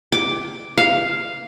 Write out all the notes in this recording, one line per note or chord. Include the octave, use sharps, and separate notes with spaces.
D6
F5